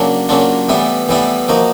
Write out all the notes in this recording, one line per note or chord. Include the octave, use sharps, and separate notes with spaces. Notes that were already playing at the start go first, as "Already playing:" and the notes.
Already playing: C#3 F#3 A#3 D4
C#3 F#3 A#3 D4 F4
A2 E3 G3 B3 E4
A2 E3 G3 B3 E4
F3 A#3 D#4 F#4